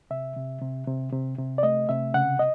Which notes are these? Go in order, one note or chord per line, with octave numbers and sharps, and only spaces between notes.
C3 E5
C3
C3
C3
C3
C3
D5
A3 D#5
C3 E5
C#3 F#5
D#5